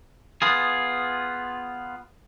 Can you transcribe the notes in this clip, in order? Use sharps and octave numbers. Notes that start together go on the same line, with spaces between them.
B3 F4 G#4